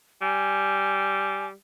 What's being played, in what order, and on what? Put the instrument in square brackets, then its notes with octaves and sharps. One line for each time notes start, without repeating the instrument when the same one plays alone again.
[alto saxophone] G3 [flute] G#5